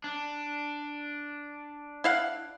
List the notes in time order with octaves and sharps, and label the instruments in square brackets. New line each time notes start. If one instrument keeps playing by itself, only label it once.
[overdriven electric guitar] D4
[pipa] E4 F5 F#5